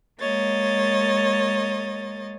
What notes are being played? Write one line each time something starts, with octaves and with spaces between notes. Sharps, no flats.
G#3 A#3 C#5 D#5 A6